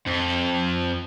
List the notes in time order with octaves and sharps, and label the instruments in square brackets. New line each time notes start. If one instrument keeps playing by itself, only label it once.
[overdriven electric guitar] F2